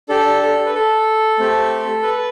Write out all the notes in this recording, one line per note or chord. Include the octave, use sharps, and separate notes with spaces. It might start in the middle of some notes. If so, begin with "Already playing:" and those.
D4 G4 A4
A4
B4
A4
A3 C4 G4
B4